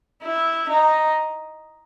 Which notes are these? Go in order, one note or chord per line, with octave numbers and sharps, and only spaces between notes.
E4
D#4